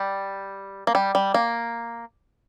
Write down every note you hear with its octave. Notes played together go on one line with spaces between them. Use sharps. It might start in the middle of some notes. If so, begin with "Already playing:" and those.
Already playing: G3
A#3
G3
G3
A#3